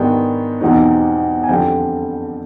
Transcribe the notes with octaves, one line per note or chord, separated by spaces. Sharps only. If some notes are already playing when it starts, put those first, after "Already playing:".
Already playing: G#2 D#3 G3 B3 D4 G5
E2 B2 G3 C4 D#4
G#5
F2 D3 G3 G5